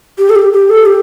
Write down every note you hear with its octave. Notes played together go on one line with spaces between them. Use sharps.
G4
A4
G4
G4
A4
G4